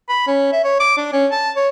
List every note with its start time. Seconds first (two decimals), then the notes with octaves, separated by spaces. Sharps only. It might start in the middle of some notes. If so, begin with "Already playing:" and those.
0.09 B5
0.27 C#4
0.53 E5
0.64 C#5
0.80 D6
0.97 D4
1.13 C#4
1.31 A5
1.56 C#5